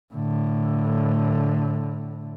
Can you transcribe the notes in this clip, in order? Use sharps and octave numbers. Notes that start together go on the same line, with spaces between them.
A2 D3